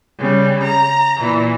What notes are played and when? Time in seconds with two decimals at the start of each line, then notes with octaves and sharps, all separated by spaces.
0.17 C#3 G3
0.62 A#5
1.21 A#2 E3